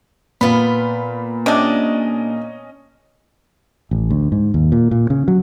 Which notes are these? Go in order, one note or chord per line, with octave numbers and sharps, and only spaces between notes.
A#2 B3 F4 B5
C3 C#4 D4 D#5
A1
D2
G#2
D#2
A#2
A#2
C#3
F#3